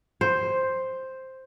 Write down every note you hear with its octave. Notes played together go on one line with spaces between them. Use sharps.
C5